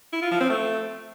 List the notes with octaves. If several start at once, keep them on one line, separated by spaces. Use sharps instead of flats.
E4
F4
F3
C4
A3